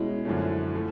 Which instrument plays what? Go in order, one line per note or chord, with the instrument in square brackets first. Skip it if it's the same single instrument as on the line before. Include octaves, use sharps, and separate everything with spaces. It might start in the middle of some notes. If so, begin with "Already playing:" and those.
Already playing: [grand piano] B2 G#3 C#4 [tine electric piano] E4
[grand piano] F#2 D3 F3 A3 C#4
F3 A3